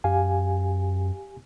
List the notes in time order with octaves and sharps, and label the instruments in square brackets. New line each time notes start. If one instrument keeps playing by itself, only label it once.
[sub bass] F#2 [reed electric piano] G4 F5 G#5